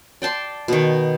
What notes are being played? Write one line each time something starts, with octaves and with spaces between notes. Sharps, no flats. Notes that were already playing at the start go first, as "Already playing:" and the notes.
D5 G5 A5 C6
B2 D#3